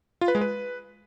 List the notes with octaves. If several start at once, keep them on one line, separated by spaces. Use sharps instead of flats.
F4
B4
G#3
B4